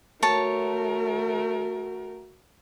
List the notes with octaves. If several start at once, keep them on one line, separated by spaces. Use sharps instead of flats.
A3 F#4 A#4 C#5 A5